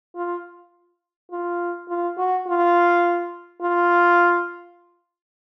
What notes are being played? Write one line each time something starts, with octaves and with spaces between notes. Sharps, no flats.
F4
F4
F4
F#4
F4
F4